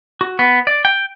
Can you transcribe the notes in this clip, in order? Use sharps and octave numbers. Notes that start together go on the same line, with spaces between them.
F#4
B3
D5
G5